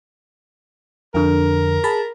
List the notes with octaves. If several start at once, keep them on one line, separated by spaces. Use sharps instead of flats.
F2 D3 A#4
G#4 A5 B5